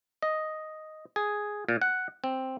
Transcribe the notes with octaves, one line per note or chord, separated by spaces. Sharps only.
D#5
G#4
A#2
F#5
C4